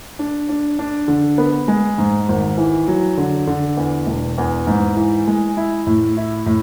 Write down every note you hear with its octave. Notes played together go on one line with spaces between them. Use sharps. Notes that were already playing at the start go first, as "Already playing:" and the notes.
D4
D4
D4
D3
B3
G#3
G#2
G#1
E3
F#3
D3
D3
E2
E1
E2
G#2
E3
G#3
E4
A2
E4
A2